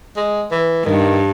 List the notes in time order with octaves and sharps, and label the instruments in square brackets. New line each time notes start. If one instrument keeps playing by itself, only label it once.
[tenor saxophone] G#3
E3
[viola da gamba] G2 [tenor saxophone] D#3